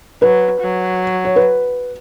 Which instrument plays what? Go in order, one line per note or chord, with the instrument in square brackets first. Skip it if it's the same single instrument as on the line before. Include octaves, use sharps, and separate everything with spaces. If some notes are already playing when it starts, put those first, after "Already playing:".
[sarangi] F#3 [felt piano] B4
[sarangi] F#3
[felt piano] C#5
B4